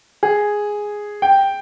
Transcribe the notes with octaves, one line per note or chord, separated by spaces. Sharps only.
G#4
G5